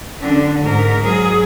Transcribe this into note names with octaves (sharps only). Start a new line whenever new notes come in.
D3 D4
G#2 A#4
F#3 G#4